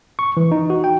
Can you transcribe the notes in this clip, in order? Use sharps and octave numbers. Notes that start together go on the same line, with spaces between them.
C#6
E3
D#4
F#4
G5